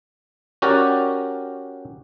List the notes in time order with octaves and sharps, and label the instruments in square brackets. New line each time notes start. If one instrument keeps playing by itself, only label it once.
[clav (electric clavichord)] C#4 F#4 G4 A#4 D5